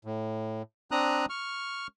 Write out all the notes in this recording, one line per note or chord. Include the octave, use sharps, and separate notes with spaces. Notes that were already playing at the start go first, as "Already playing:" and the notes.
A2
C4 D4 A#5 D#6 F#6
C#6 F6